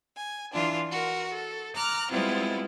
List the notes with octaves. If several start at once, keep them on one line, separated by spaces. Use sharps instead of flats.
G#5
E3 D4 F4
F#4 A#4
A4
A#5 D6 F6 F#6
G3 G#3 B3 C4 E4 F4